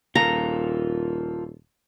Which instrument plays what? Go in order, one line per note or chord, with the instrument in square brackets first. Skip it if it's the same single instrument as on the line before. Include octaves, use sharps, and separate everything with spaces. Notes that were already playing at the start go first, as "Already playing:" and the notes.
[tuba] D#1 [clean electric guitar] F4 A4 A#4 [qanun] A#5